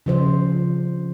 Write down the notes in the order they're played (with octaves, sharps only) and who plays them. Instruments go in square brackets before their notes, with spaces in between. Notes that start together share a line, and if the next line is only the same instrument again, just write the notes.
[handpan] C#3 F3 C5